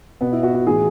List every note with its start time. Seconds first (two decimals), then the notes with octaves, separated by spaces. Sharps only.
0.21 B2 B3
0.32 E4
0.43 F#4
0.54 F#4
0.67 A2 E3 G#4